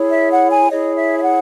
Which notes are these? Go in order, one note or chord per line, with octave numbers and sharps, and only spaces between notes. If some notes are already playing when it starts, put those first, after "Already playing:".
Already playing: E4 G#4 C#5
E5
F#5
G#5
E4 G#4 C#5 D#5
E5
E5
F#5